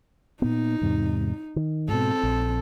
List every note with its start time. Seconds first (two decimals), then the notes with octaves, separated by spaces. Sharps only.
0.42 A#2 B3 D#4
0.82 E2 G#2 C3
1.56 D#3
1.88 G#2 B2 C4 A4
2.23 A#1